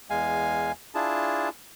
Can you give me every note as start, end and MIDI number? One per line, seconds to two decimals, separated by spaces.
0.10 0.72 40
0.10 0.72 56
0.10 0.72 77
0.10 0.72 80
0.95 1.49 62
0.95 1.49 64
0.95 1.49 65
0.95 1.49 68
0.95 1.49 81